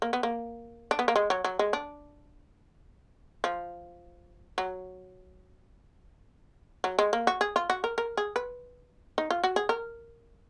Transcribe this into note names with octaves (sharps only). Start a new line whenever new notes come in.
A#3
B3
A#3
D4
B3
A#3
G#3
F#3
F#3
G#3
D4
F3
F#3
F#3
G#3
A#3
F#4
G#4
F4
F#4
A#4
A#4
G#4
B4
D#4
F4
F#4
G#4
A#4